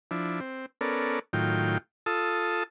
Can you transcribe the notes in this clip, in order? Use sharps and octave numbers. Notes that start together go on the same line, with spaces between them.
F3 D4 E4
C4
B3 C#4 A4 A#4 D5
A2 D#3 F#3 F4 G5
F4 A4 A5 D#6 E6